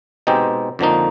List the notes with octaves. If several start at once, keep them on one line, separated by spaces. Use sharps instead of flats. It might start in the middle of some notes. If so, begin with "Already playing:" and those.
B2 G#3 C4 D#4 G4
F2 D3 F3 A#3 D#4